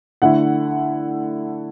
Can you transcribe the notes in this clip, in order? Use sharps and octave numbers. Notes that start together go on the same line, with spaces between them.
D3 A3 E4 F#5